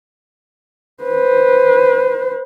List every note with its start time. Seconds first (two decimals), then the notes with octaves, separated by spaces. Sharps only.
1.03 B4 C5